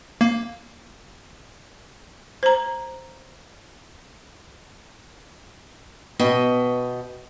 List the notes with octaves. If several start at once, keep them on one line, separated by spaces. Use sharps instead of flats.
A#3
C5 A#5
B2 D#5 G5